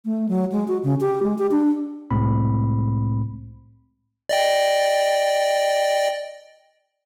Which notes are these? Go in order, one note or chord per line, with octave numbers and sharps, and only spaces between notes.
A3
F#3
G#3
F#4
C#3
G4
G#3
G4
D4
C2 A2 G#3 C4 B5
D5 D#5 G5